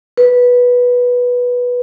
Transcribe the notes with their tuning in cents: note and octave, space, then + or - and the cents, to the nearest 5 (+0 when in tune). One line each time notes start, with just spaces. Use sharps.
B4 -10